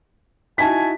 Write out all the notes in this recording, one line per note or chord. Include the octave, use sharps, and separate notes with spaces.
D#4 E4 F#4 G#5 A5 B6